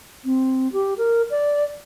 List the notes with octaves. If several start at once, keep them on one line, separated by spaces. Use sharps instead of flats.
C4
G4
A#4
D5